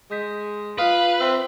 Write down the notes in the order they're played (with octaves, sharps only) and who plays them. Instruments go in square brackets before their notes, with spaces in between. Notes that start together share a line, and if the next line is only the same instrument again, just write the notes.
[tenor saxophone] G#3 [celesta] D#6 G6 B6
[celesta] F4 D#6 [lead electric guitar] B4 [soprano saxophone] F5
[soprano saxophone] C4 [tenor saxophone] E5